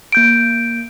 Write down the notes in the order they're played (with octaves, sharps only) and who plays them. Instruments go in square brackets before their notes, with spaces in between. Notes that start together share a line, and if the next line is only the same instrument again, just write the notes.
[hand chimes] A#3 G6 D7